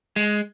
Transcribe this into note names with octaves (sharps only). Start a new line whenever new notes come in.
G#3